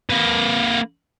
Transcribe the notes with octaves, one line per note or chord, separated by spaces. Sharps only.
A#3 B4